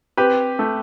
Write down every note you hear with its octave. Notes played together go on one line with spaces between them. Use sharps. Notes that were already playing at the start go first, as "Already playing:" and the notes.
C4 G4 B4
A3